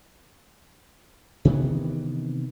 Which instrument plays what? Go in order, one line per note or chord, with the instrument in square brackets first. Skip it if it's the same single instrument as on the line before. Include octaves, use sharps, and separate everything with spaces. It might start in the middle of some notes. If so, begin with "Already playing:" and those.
[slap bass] C3 D#3 E3 B3